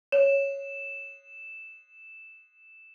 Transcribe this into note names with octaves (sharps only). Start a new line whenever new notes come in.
C#5 E7